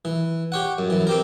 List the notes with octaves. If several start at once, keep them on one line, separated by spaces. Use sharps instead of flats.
E3
G4 C#5 F#5
F#2
F#2 E3
C4 G4 A#4